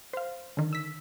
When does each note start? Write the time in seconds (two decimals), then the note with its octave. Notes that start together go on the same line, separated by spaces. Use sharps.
0.13 C5 F5
0.57 D3 D#3
0.73 E6 B6